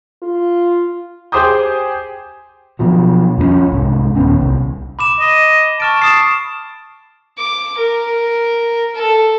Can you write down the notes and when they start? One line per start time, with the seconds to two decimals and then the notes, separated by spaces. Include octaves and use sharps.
0.22 F4
1.32 G4 G#4 C5 D6 D#6 G6
2.79 B2 F3 F#3
3.38 F2 F3 B3 C#4
3.72 C2 G#2
4.15 D#1 G#1 B3 C#4
4.41 C2
4.99 B5 D6 E7
5.20 D#5
5.80 A5 C#6 F6 D7
6.02 A5 D#6 C7
7.38 D6
7.78 A#4
8.95 A4